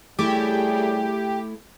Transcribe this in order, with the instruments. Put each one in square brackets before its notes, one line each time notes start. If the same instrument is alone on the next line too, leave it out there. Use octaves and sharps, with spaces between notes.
[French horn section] A2 G3 G#4 [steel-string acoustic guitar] A3 E4 [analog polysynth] G4